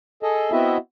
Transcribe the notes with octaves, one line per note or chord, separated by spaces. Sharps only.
G#4 A4 D#5
B3 C4 E4 F#4 D#5 E5